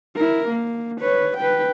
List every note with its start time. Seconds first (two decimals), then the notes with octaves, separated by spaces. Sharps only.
0.16 E4 A#4
0.48 A#3
1.00 B4 C#5
1.37 B4 G5